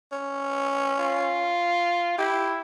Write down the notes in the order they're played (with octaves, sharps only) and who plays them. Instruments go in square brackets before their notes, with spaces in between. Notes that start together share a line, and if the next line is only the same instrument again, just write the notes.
[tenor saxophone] C#4
[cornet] F4
[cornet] E4 [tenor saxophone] G4